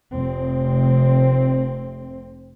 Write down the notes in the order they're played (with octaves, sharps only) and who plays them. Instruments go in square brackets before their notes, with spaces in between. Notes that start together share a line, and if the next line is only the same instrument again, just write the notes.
[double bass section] F1 C4